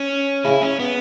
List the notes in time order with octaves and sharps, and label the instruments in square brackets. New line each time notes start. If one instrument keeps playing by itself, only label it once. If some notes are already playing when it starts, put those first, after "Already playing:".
Already playing: [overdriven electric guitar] C#4
[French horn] C#3 [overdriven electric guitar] E4
[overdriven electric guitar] C#4
B3